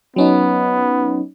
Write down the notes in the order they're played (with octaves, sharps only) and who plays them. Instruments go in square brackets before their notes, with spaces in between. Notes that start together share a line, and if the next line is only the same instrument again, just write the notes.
[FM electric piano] F#3 C#4 D#4 [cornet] B3